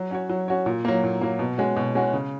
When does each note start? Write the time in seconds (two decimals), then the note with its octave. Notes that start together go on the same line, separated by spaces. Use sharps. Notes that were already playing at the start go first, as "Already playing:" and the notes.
Already playing: F#3
0.11 C#4 F#4 C#5
0.29 F#3
0.48 C#4 F#4 C#5
0.66 A#2
0.85 F#3 A#3
1.04 A#2
1.21 F#3 A#3
1.39 B2
1.58 G#3 C#4 F#4
1.76 B2
1.95 G#3 C#4 F#4
2.13 C#3